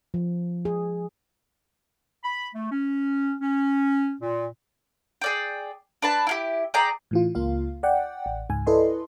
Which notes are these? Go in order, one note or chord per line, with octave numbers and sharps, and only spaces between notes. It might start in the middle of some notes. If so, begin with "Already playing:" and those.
F3
G#4
B5
A3
C#4
C#4
A#2
G#4 D5 G5
D4 B4 A5
E4 F4 G4
G#4 D5 G5 A#5
A2 E3 F4
C#2 A#3 F4 F5
D5 F#5 G5
A1
C#2 G#2 G#5
E4 A4 B4 D5 D#5 C6